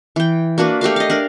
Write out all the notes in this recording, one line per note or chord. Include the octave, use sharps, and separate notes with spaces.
E3 G5
A#3 D4 F#4 B4
A3 G4 A#4 F5
D#5 F5
D4 A#4